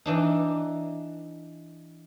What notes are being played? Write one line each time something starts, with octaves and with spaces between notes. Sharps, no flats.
E3 D4 D#4